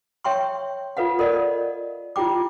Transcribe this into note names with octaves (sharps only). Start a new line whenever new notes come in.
C#5 E5 G5 C6 C#6
F4 A4 B4 F5 F#5
A4 A#4 D5 D#5 F#5
E4 F4 G4 G5 D6